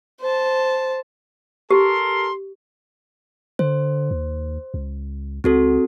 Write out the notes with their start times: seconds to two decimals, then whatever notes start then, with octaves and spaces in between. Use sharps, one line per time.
0.21 C5 A5
1.71 G4 A4 A#4 C6
3.59 D3 C5
4.11 D#2
4.74 C#2
5.44 C#2 C4 F#4 A4